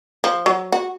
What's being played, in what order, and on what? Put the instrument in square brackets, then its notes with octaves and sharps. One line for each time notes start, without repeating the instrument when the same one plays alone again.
[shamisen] F3
F#3
F#4